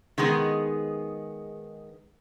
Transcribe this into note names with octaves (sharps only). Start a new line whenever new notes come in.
D#3 G#3 B3 G#4